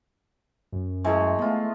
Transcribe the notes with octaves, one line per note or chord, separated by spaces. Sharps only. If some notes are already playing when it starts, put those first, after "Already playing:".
F#2
E3 G#3 A3
A3 B3 F4